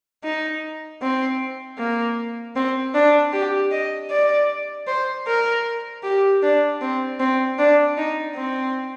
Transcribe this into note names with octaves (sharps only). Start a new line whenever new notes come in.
D#4
C4
A#3
C4
D4
G4
D#5
D5
C5
A#4
G4
D4
C4
C4
D4
D#4
C4